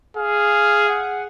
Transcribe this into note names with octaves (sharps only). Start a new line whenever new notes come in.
G#4 F5
F#5